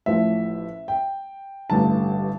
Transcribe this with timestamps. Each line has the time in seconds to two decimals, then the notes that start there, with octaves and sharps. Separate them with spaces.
0.06 A1 A2 F3 E5
0.88 G5
1.70 A1 G2 D3 A5